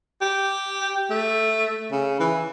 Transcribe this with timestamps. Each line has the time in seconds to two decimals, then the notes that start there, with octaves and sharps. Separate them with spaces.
0.21 G4
1.10 A3
1.92 C#3
2.20 E3